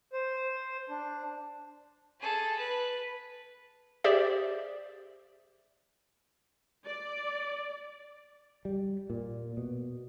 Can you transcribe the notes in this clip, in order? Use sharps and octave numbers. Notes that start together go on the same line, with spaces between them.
C5
D4
G#4 A4
B4
G4 G#4 C5 D5 E5
D5
G3
A#2
B2